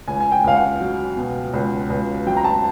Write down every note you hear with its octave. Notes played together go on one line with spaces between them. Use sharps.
C#2 G#5
G#5
G5
C#2 F5
F#5
F#3
B2
C#2
C#2
F#3 G5
A#5
A5